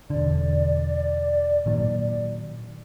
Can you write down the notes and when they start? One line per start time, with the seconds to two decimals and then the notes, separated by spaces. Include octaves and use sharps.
0.10 E1 D3 D5
1.66 A#2 D#3 F#3